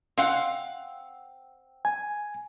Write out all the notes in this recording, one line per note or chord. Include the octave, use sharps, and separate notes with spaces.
C4 F5 F#5
G#5